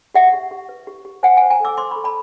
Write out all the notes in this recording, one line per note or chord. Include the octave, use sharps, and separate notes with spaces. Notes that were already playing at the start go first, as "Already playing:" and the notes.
G4 E5 F#5
G4
G4
B4
G4
G4
C5 F#5 G#5
F#5 G#5
C5
G#5 A#5
A4 D6 E6
C5 C6 D6
B5 C#6
A4
A5 B5